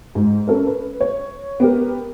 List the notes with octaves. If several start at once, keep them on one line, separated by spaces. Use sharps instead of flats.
G#2
C#4 A4 A#4
B4
C#5
B3 G4 A#4